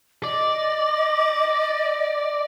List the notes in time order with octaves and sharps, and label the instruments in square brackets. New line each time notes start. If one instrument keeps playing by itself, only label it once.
[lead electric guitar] D5 [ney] D#5